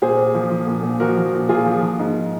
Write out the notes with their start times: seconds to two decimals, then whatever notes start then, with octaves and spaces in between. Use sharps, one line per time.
0.02 A#2 G#4 C5
0.17 A#2
0.34 F3
0.51 F3
0.67 A#2
0.83 A#2
1.00 F3 F#4 A#4
1.17 F3
1.33 A#2
1.49 A#2 F4 G#4
1.66 F3
1.82 F3
1.99 G#2